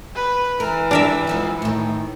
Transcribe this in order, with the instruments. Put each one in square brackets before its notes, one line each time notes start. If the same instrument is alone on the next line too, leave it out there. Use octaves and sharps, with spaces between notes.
[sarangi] B4
[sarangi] E3 [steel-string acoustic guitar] A#4
[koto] D4 A#4 E5 [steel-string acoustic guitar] G4
[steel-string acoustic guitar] G#2 F3 B3
A2 D#3